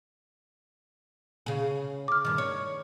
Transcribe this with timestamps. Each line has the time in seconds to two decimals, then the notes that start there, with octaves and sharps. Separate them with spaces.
1.46 C#3 G#4
2.08 D6 F6
2.25 G2 D#3
2.38 C#5